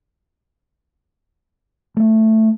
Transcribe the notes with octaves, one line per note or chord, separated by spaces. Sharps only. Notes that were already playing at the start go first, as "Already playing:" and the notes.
A3